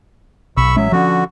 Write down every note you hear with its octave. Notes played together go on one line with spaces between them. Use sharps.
B1 B5 C#6 E6
A1 F#3 G#3 C#4 E5
D3 F3 C#4 F#4